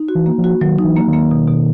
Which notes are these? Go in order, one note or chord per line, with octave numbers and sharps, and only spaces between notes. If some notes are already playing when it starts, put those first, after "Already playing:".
Already playing: D#4
F#4
E3
A#3
F3
F#4
D#3 F#3
D#4
E3
A#3
D#3
A#3
B2
B2